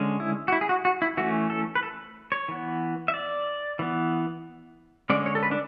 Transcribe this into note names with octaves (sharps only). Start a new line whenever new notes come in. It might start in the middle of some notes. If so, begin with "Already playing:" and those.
Already playing: D3 G#3 C#4
E4
F#4
E4
G#4
F#4
F#4
E4
E3 A3 C#4 F#4
A4
B4
A4
C#5
E3 B3
E5
D5
E3 B3
D3 G#3 C#4 D5
C#5
A4
B4
D4